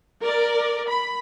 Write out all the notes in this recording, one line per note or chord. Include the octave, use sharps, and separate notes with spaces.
A#4 D5
B5